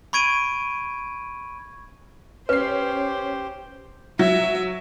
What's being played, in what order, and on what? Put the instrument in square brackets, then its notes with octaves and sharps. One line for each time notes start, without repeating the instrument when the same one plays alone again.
[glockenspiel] B5 C#6 G#6 D7 D#7
[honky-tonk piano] C#4 C7 [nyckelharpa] G4 C5 [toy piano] B4
[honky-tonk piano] F#3 [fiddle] E5